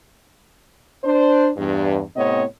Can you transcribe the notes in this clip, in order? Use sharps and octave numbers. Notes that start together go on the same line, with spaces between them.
D4 C5
E2 G2
A2 C3 B3 C4 C#5 D#5